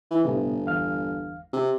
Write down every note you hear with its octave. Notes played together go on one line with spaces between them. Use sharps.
E3
G1 A2 C3 B3
E2 F5 F6
C3